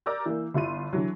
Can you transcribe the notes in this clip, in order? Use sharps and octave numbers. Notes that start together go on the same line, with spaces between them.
A#4 D5 A#5 E6 G6
E3 A#3
G1 E4 F4 C6 D#7
D3 E3 F#3